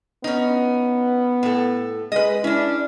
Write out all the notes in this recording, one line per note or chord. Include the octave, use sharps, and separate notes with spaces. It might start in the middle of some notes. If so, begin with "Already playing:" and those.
B3 C#4 D#4
A2 A4
G#3 B4 D#5
C#4 D4 E4